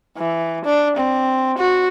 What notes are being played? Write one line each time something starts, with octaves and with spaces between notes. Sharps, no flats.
E3
D4
C4
F#4